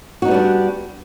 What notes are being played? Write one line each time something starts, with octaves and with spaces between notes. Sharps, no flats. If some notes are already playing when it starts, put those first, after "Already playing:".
G3 B3 D4 D#4 F#4